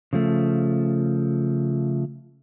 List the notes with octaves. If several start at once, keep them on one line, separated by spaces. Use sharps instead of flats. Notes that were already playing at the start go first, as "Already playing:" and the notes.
C#3 F3 A3